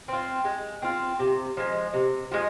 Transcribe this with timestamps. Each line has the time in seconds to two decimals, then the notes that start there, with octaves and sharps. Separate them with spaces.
0.08 C4 F4
0.45 G#3
0.82 C4 F4
1.19 C3
1.57 F3 G#3
1.94 C3
2.32 F3 G#3